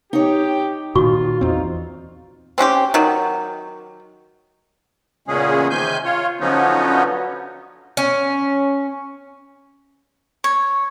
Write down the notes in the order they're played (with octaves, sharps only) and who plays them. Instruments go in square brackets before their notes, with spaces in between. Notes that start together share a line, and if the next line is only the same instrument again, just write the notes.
[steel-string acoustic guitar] D#4 C#5 [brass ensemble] G4
[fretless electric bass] A#2 D#3 [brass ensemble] F4 [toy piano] F#4 C#6
[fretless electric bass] E2 C4 [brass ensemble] D#4 F4
[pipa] C4 C#4 F#4 G4
D#3 F#3
[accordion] E2 A#2 C#3 G#3 C#4 G#4
C3 D#3 G#5 G6
F4 C#5
D3 F3 F#3 B3 C#4 D#4
[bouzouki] C#4
[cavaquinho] C#5